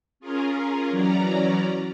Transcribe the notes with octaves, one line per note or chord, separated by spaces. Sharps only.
C#4 F4 G#4 A#4
E3 F#3 C#4 D5 A#5